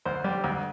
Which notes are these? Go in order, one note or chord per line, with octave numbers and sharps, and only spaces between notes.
D2 C5
G3
D2